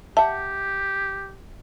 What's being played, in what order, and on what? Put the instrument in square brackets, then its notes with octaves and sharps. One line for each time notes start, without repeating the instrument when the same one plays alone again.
[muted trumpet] G4 [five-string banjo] E5 F#5 [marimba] A5